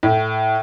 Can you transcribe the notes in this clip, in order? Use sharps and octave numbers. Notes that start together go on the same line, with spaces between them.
A2